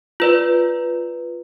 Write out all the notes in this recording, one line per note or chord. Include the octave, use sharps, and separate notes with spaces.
F4 B4 D5